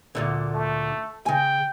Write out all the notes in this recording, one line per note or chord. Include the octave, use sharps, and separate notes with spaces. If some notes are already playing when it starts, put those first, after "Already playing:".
D2 A#2 D3
A3
C#3 G5 G#5